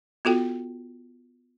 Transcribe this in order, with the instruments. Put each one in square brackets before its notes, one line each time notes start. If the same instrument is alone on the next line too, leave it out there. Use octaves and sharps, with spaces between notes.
[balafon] B3 F4 F#4 A4 G5